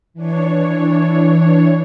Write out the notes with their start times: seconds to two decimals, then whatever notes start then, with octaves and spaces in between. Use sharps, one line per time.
0.14 E3 D4 C#5